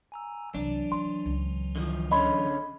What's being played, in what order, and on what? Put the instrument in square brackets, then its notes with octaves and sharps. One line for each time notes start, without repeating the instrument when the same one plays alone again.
[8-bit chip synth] G#5 A#5 E6
[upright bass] C2 [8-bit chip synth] E3 F#3 [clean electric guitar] D4
[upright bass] D#3 [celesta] C6
[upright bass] C#2
[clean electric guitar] D3 D#3 F3
[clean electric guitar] D3 C#4 [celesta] D#5 B5 C6